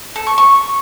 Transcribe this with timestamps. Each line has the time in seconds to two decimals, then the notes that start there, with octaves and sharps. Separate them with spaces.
0.16 A4
0.27 C#6
0.38 C#6